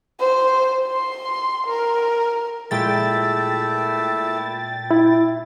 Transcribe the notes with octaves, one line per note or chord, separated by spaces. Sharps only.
C5
C6
A#4
A#2 G#3 A3 E4 G5 A6
E4